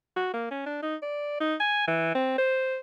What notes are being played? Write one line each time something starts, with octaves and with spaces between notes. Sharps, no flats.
F#4
A#3
C#4
D4
D#4
D5
D#4
G#5
E3
C4
C5